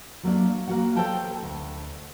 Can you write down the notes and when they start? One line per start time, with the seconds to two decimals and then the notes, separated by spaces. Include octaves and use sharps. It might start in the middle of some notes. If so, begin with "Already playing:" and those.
0.23 F#3 A3 A#3 D4
0.68 A#3 F#4 F#5
0.96 A4 C5 C#5 G5 A5
1.42 D2